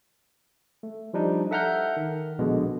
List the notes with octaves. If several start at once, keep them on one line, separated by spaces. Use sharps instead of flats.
A3
F3 G3 D4 D#4
A4 E5 F#5 A#5 F6 G6
D#3
A#1 B2 D3 G#3